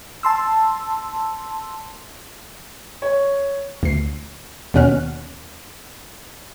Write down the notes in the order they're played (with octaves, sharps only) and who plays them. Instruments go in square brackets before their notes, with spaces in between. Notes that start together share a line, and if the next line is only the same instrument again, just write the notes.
[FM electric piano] A5 C6 E6
[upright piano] C#5
[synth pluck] D2 C7
D#2 B2 C#4 F#5 F6